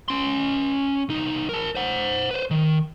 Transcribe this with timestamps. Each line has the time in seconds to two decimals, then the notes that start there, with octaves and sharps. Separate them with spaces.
0.08 C#4 C6
1.09 C2 D#4
1.49 A#4 A5
1.75 C5 F#5
2.31 B4 C5
2.51 D#3